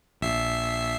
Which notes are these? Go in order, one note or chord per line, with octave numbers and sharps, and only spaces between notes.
A#1 E5 C7